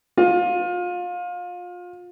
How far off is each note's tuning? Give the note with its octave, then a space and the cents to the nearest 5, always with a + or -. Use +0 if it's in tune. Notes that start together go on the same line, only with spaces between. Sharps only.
F4 +30